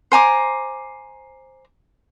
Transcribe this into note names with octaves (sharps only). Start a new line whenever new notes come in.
C5 G#5 A#5 D6